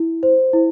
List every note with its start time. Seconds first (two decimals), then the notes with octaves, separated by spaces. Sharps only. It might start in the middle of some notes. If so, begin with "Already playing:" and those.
Already playing: E4
0.23 C5
0.53 E4